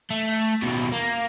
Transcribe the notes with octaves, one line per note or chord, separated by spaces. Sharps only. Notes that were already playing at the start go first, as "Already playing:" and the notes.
A3
D#2 B2
A#3